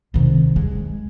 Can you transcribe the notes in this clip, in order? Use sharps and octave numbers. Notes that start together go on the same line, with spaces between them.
C3 D#3
G#3